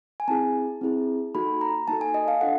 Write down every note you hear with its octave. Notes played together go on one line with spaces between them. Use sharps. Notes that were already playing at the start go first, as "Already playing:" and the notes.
G#5
C4 E4 G#4 A5
C4 E4 G#4
A#3 D#4 F#4 A4 B5
A#5
A#3 D#4 F#4 A4 A5
G#5
D#5
F5
D4 F4 A4 F#5